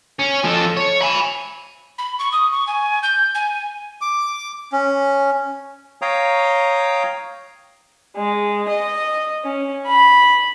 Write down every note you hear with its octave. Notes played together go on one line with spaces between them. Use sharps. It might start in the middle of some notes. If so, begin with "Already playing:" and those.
C#4
F3 A4
C#5
G#5 B5
B5
C#6
D#6
C#6
G#5
G6
G#5
D6
C#4
C#5 F5 G5 A#5 D#6
G#3
D#5
C#4
B5